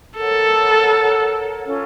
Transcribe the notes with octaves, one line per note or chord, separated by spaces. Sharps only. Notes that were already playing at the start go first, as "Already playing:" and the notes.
A4 A#4 C#5 F#5
C#4 F4 A4 C#5